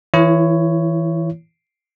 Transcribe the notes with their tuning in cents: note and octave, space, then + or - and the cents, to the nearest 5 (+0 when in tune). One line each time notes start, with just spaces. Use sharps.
E3 -15 E4 +30 C#5 +0